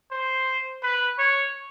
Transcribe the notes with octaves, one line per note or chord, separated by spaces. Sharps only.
C5
B4
C#5